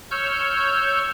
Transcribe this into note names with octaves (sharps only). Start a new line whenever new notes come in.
C#5 C#6 E6 F6 G6